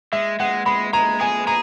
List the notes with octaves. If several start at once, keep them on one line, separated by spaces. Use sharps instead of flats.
G#3 E5
G#3 F#5
G#3 B5
G#3 A#5
G#4 G#5
G#4 A#5